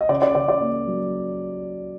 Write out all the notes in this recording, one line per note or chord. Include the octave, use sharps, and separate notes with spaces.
D#5
C#3 D5
D5
C#3 D5
D5
A#3
F#3